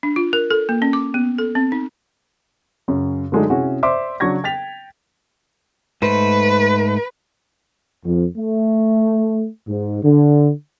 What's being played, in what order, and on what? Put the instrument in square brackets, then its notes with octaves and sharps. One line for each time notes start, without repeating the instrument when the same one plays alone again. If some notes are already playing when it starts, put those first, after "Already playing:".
[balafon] D4
F4
A#4
A4
A#3
C#4
D6
B3
A4
C4
D#4
[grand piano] F#2 C#3
D3 F#3 G#3 A3 D4 D#4
C3 C#4 E4 F#4 G#4
C5 D5 E5 C6 D6
C#3 F#3 D4 C#6 G#6 A#6
G5 A6 B6 F7
[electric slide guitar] G#2 A3 C5 [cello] B4
[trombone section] F2
A3
G#2
D3